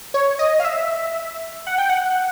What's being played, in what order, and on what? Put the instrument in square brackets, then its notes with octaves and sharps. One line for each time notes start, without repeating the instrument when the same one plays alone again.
[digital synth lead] C#5
D#5
F5
E5
F#5
G5
F#5